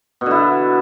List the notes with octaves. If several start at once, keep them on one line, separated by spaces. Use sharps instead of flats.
B2 D3 E4